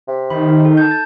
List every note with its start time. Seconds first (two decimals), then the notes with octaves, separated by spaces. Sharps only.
0.08 C3
0.30 D#3 B5
0.49 D#4
0.65 A4
0.77 A5 G6
0.91 A6